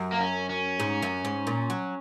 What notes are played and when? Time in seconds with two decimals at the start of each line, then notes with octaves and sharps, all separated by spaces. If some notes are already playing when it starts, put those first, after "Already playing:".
Already playing: F#2
0.12 A#3
0.19 C#4
0.50 C#4
0.80 G#2
1.02 F#2
1.25 G#2
1.47 A#2
1.70 F#3